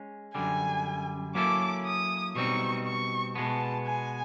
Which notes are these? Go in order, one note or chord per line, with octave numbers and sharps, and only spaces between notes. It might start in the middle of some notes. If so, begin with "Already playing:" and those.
Already playing: G#3 C#4
F#2 D3 G3 G#5
F#3 A#3 C#4 E4 A4 D6
D#6
B2 G3 C4 D#4 C#6
C#6
B2 G#3 B3 A5
G#5